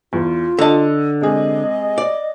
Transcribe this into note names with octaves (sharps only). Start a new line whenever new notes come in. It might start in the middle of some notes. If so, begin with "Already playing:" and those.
E2 F4
D3 A4 D#5 A5
C3 G#3 G#4 D#5
D5